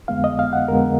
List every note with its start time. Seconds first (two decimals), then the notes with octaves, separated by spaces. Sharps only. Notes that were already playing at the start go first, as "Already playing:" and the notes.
0.08 F2 D3 G#3 B3 F5
0.24 D#5
0.39 F5
0.53 F#5
0.68 F2 D3 G#3 B3 A#4